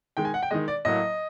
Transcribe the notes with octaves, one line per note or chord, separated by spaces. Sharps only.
D#3 G#3 G5
G#5
F#5
G5
D#3 G#3 D#5
D5
A2 F#3 A#3 D#5